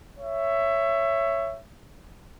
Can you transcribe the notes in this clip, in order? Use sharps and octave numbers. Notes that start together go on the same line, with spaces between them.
C#5 E5